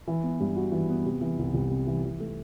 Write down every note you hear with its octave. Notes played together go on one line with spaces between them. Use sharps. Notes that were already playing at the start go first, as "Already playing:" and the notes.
E3
B3
G2
F#4
E3
B3
C3
E3
C2
C2
C3
E3
E3
A3